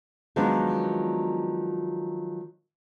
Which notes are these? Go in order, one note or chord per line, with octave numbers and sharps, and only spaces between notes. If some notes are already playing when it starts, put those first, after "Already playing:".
D#3 F3 F#3 G#3 B3 D4